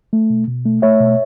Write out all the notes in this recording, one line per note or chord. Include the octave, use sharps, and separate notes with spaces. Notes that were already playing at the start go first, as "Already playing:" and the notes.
A3
B2
B2
A3
A3 C#5 E5
B2